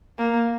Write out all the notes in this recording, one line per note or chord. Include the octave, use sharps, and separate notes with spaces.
A#3